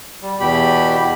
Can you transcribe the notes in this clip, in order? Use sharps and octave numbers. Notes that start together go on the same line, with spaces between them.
G3
E2 B2 G4 B5